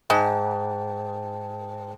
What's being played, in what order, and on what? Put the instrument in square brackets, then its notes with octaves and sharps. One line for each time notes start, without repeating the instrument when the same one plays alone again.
[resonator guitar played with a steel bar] G#2 [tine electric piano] G5 A5